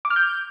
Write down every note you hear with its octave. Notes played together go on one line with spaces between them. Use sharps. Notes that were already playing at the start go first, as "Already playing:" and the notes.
D6
F6
G6